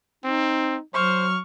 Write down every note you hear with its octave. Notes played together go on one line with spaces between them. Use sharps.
C4 D#4
F#3 C5 C#6 F6